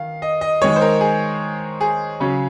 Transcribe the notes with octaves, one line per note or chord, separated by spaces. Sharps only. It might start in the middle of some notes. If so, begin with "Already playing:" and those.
Already playing: D#3 F5
D#5
D#5
D#3 G#3 D#4 C#5
C5
A#4
G#4
G#4
C#3 F#3 C#4